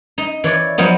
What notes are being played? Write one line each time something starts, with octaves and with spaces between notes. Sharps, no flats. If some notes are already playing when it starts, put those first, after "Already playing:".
D#4
E3 C#5 D5
F3 F#3 B3 D#4